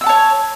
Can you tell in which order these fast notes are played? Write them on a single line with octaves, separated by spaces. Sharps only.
E6 F#5 A5 C#5